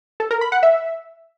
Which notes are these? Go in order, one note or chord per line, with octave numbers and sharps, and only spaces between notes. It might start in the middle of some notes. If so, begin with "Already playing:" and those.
A4
A#4
B5
F#5
E5